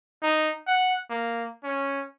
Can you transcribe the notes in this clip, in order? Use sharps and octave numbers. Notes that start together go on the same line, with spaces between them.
D#4
F#5
A#3
C#4